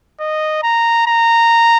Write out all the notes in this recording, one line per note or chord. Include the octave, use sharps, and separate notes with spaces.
D#5
A#5
A#5